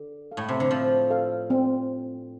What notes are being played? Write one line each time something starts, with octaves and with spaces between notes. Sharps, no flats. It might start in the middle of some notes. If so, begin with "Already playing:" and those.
Already playing: D3
A4 F5
A2
C3
D3
F3 C4
A4 F5
C4